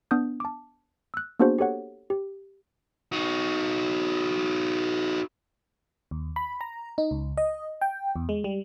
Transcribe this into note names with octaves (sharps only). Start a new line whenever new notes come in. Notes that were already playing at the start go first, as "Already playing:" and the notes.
B3 D4 D#6 G6
A5 D6
E6 F#6
A#3 B3 D4 F#4 G#4 C5
G4 A4 C#5 F#5
G4
D#4 F#4
D#2
B5
A#5
D#4
C#2
D#5
G5
E2
G#3
G3